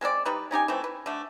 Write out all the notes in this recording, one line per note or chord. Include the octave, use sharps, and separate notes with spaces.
G#3 C4 A4 D5
G3 D#4 B4
C#4 D#4 G4 G#5
E3 A3 C4
B4
D3 A3